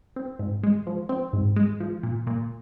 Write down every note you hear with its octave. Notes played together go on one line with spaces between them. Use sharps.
C4
G#2
G#3
F3
C4
G#2
G#3
F3
A#2
A#2